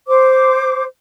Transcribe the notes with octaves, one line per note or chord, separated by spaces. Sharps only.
C5 D6